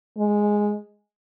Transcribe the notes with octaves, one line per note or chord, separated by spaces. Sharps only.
G#3